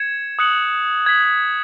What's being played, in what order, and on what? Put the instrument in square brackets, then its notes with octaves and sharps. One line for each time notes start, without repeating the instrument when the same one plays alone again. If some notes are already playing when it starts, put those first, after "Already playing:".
Already playing: [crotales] G#6 C#7 E7
D#6 F#6 C#7 F#7
G#6 B6 F#7